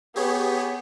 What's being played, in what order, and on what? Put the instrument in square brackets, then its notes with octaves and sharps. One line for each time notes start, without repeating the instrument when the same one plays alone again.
[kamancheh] B3 [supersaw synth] G4 G#4 C#5